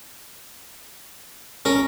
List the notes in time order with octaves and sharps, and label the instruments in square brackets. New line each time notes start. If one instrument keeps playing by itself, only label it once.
[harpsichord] C#4 [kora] A#4